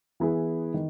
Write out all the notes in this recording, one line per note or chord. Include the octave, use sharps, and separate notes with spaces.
E3 B3 E4 G#4
D#3